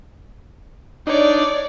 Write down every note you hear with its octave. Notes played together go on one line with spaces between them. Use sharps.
D4 D#4 C#5 D5